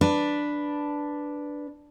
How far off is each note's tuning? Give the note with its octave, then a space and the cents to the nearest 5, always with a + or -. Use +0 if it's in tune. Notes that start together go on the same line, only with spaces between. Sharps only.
D4 +0 B4 +0